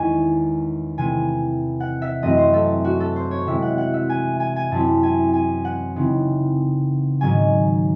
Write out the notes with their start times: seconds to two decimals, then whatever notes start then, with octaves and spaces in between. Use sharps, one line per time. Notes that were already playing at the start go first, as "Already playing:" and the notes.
Already playing: E2 D#3 G#3 C#4 G#5
0.98 C3 E3 A3 G#5
1.80 F#5
2.02 E5
2.22 F#2 E3 A3 C4 D#5
2.38 C5
2.54 A4
2.84 F#4
3.00 A4
3.16 C5
3.31 C#5
3.46 C3 E3 G#3 E5
3.62 F#5
3.78 F#5
3.94 E5
4.09 G#5
4.40 G#5
4.56 G#5
4.71 F#2 E3 C4 E4 A5
5.03 G#5
5.34 G#5
5.65 F#5
5.96 C#3 E3 C4 D#4
7.21 G#2 D#3 F#3 C#4 G#5